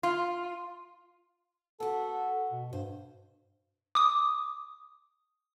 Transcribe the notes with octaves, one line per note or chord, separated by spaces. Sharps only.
F4
B3 F#4 A4
B2
G2 C5
D6 D#6